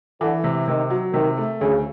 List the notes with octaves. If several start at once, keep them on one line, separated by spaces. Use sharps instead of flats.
D3 E3
C3
C3 D#3
F#3
C3 D#3
A3
D2 C#3